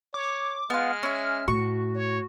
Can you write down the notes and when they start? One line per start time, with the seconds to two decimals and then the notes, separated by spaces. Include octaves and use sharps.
0.14 C#5 D6
0.70 G#3 B3 F4 F6
1.03 C#4 E5
1.48 A2 F#4 C#6
1.95 C#5